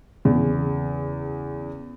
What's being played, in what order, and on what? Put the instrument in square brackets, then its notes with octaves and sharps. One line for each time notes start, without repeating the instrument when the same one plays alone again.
[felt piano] E2 [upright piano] C#3